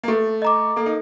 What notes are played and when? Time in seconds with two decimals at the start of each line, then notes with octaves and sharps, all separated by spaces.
0.04 A#3
0.08 A3 A4
0.42 D#5 A#5 D6
0.76 A#3 A4
0.86 D#4